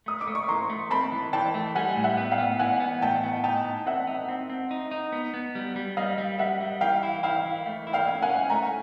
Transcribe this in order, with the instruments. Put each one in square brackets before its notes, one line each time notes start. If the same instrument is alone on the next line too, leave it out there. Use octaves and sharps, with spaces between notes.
[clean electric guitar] A3 [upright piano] D#6
[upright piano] D6
[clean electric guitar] A3
[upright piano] C#6
[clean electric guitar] E3 [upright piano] A#5 C6
[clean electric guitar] A3
[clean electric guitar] C4 [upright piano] A5 B5
[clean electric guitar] E3
[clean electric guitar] E3 [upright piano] G5 A5
[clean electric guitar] A3
[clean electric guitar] G3 [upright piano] F#5 G#5
[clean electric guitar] A2
[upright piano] E5 F#5
[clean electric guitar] B3
[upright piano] F5 G5
[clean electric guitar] B3
[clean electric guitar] E3 [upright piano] F#5 G#5
[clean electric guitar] B3
[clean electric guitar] A2 [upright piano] G5 A5
[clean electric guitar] B3
[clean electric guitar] D#4 [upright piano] G5 A5
[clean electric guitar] E3
[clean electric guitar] C4 [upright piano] E5 F#5
[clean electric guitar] D#4
C4
C4
D#4
D#4
B3
B3
G3
G3
[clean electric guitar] G3 [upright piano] D#5 F5
[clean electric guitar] G3
[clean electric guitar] G3 [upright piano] E5 F#5
[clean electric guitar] G3
[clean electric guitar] E3 [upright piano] F5 G5
[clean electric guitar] E4
[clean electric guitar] E4 [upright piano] F5 G5
[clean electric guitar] E3
A3
E4
[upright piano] F5 G5
[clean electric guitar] C#4
[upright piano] F#5 G#5
[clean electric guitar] C#4
[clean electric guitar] A3 [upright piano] G#5 A#5